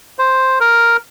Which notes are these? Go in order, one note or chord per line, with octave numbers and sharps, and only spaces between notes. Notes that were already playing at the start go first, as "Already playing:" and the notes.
C5
A#4